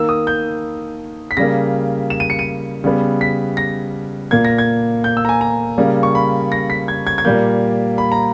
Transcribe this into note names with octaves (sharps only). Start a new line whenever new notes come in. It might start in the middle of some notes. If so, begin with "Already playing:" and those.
Already playing: D#3 A#3 E6
D#6
G6
B6
C#3 G3 A#3 A#6
E7
D#7
C#7
D#7
C#3 G3 B3
B6
A#6
A#2 A#3 G#6
A#6
G#6
G6
E6
A#5
G#5
A#5
C#3 G3 A#3
C#6
B5
A#6
B6
G#6
G#6
G#6
A#2 G3 A#3 G6
B5
A#5